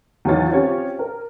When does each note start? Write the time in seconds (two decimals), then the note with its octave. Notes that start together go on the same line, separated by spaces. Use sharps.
0.25 E2 D#3 F#3 F4 C#5 A6
0.51 C4 C#4 F4 G4 C#5 G5
0.99 A#4